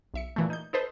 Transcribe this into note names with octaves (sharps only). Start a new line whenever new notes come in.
B1 E5 C#7
A#2 E3 A3
D#4 G6
D#4 A4 B4 C5